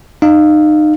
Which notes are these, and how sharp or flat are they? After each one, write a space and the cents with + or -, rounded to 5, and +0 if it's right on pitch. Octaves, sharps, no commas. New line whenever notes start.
D#4 -30 F5 +0